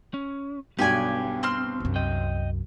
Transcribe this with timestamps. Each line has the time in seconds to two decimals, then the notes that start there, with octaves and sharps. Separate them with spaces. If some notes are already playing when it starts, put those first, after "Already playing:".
0.14 C#4
0.79 B1 G2 B3 G4 D5 G#5
1.43 C4 C6 F6
1.80 C2 F#2
1.96 D#5 G5